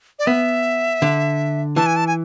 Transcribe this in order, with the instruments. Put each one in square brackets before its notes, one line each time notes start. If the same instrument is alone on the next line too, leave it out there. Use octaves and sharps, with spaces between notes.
[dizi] D5
[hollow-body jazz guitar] B3 [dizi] E5
[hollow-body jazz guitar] D3
[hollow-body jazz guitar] E3 [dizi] A5
[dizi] G#5
A5
G#5